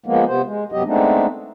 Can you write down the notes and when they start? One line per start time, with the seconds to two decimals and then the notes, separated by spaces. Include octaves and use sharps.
0.06 F3 G#3 A#3 B3
0.27 C3 B3 C5
0.46 G#3
0.72 F#2 C3 F#3 B3 G4 D#5
0.86 G#3 A3 B3 C4 D4 D#4